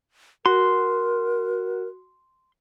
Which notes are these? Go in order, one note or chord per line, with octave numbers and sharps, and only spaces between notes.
F#4 A#4 C6